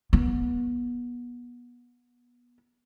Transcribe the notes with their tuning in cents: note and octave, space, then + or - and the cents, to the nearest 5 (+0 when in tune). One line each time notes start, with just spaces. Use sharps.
B3 -25